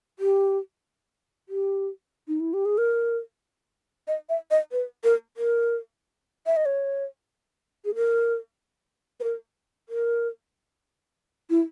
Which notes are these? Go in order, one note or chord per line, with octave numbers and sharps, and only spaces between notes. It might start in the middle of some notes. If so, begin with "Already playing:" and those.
G4
G4
D#4
E4
G4
G#4
A#4
D#5
E5
D#5
B4
A#4
A#4
E5
D#5
C#5
G#4
A#4
B4
A#4
A#4
E4